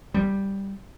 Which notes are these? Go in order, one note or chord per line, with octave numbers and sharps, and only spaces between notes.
G3